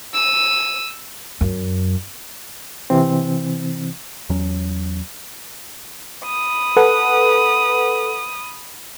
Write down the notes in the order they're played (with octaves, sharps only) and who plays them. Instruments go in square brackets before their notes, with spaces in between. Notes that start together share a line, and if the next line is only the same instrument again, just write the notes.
[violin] E6 D#7
[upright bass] F#2
[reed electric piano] C3 E3 C4
[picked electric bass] E2 F#3 C#4
[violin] B5 D#6
[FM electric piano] A4 B4 F#5